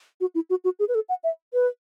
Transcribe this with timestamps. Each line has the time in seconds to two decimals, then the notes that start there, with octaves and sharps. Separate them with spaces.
0.21 F#4
0.35 E4
0.50 F#4
0.64 F#4
0.79 G#4
0.89 B4
0.95 A4
1.09 F#5
1.24 E5
1.54 B4